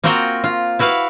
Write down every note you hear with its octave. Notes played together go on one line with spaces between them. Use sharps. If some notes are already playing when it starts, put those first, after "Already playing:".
A#3 C4 F4 F#4 A#4 G5
F4
E4 F#4 B4 F5